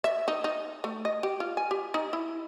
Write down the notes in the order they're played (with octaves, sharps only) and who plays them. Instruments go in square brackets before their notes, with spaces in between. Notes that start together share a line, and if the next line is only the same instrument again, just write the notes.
[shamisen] E5
D#4
D#4
A3
D#5
G4
F4
G#5
G4
D#4
E4